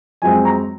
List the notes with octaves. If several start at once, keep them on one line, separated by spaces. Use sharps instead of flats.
F#2 F3 G#3 C4 G#5
A#5